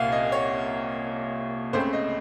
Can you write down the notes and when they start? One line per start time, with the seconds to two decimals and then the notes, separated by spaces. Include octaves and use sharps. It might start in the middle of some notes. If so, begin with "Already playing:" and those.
Already playing: C2 A#2 A#3 F5 F#5
0.12 D#5
0.32 C#5
1.73 C#2 C#3 A3 C4 C5
1.93 D#5